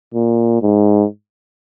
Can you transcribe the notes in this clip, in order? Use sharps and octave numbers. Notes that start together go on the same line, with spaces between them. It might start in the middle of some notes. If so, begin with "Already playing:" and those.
A#2
G#2